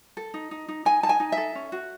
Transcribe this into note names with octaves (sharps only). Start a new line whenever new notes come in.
A4
D#4
D#4
D#4
D#4 G#5
D#4 A5
G#5
D#4
E5
A4
C#4
F#4